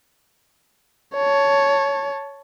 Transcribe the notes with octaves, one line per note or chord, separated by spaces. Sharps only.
C#5 A5